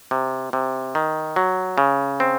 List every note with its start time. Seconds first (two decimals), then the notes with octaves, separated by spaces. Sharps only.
0.11 C3
0.53 C3
0.95 D#3
1.36 F#3
1.78 C#3
2.20 C4